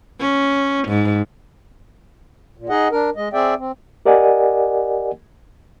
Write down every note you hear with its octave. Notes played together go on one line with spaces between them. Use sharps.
C#4
G#2
A#2
D#4 G#4 D#5 F#5
D4 A#4
G#3 D#5
C4 G#4 D5 E5 G5
C4
G4 A#4 D5 D#5 F#5 G#5